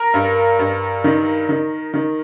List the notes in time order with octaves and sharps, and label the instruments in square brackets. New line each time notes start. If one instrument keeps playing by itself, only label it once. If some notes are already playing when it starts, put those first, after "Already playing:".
Already playing: [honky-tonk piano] A#4
[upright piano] G2
G2
D#3
D#3
D#3